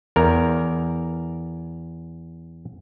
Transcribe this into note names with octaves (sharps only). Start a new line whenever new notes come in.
E2 A#4